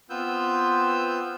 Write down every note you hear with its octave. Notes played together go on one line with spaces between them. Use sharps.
B3 C4 F4 B4 E6 G6